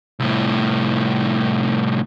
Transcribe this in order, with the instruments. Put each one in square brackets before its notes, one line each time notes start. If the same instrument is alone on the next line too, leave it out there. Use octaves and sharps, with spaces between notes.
[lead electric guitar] C2 A2